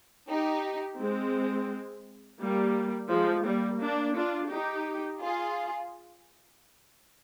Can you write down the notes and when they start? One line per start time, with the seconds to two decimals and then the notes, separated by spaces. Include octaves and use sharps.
0.29 D#4 G4
0.99 G#3 C4
2.40 G3 A#3
3.10 F3 G#3
3.45 G3 A#3
3.80 A#3 D4
4.15 D4 F4
4.51 D#4 G4
5.21 F4 G#4